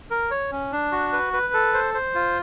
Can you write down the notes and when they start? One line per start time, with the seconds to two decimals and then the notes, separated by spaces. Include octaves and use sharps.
0.11 A#4
0.31 C#5
0.52 C#4
0.72 D4
0.92 F#4
1.13 B4
1.33 B4
1.54 A4
1.74 C5
1.94 C5
2.15 F4